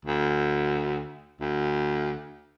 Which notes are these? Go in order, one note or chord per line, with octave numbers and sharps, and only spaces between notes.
D2
D2